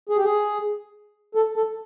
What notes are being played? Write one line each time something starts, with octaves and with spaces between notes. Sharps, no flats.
G#4
G4
G#4
A4
A4